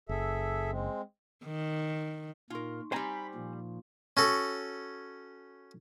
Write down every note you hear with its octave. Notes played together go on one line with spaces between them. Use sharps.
F#1 G#4 A4 E5
G#3 C4
D#3
A#2 D#4 F4 A#4 C6 C#6
G3 C4 C5 G#5 A#5 B5
A#2 F3
C#4 F#4 A4